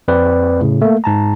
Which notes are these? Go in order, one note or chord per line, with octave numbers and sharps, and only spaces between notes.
F2 C4 B4 D5
A2 C#3
A3 A#3
G#2 A5 A#5